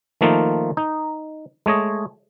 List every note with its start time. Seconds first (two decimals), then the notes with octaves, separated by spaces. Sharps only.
0.21 D#3 F3 A3 A#3 D#4 F4
0.77 D#4
1.66 G#3 A3 C#5 D#5